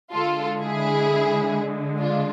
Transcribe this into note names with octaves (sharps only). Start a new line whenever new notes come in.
D3 G#3 F4 A4
E4 G#4
D4 F4